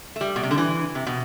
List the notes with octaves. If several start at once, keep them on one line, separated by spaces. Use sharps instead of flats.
A3
G3
B2
C3
D3
E3
C3
B2